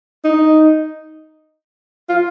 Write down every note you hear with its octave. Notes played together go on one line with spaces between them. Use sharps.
D#4
F4